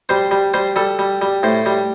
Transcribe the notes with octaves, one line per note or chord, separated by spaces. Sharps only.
G3 C5
G3
G3 C5
G3 A4
G3
G3
A2 C5
G3